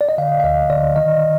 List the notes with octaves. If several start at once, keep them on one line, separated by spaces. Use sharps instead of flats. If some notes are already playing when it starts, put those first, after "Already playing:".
D5
D#5
D3 F5
F5
D2 D#5
D3 D5
D#3 D#5